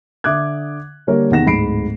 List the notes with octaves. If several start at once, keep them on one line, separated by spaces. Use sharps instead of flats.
D3 E5 D6 D#6 F#6 G#6
D3 G3 A#3 A#4 C#5
E2 C3 D#3 F#5 A#6 E7
D1 G#2 B5 C7 D7